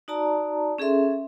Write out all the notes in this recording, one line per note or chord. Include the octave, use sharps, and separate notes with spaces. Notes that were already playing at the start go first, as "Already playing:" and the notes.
D#4 F#4 D5 A5 A#5
C#4 G#4 A4 E5 C6